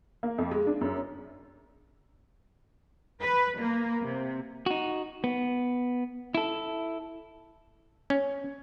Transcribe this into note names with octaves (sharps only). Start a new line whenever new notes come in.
A#3
F2
G#3
D4
F#2
B4
A#3
C3
D#4 F#4
B3
E4 A4
C#4